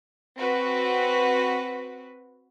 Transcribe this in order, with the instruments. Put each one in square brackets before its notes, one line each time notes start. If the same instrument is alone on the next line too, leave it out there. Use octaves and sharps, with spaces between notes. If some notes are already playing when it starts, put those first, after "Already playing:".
[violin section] C4 F#4 B4